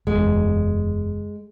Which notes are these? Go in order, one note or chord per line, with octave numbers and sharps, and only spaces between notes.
F#1 E2 G#3